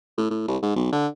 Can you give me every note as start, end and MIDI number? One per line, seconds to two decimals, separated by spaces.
0.18 0.30 45
0.31 0.45 45
0.48 0.57 36
0.63 0.75 44
0.76 0.88 35
0.92 1.07 50